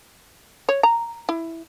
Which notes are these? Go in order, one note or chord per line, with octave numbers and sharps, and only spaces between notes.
C#5
A#5
E4